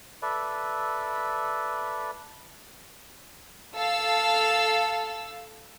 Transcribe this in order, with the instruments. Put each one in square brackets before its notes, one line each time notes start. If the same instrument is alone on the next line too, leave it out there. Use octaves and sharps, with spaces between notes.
[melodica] A4 B4 D5 E5
[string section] A4 F5 E6